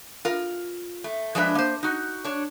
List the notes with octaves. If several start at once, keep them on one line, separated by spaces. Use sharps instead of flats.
F4 A#4
A3
F3 G#3 D4 B4 E5
A#3 C5
D#4 F#4
D4 C#5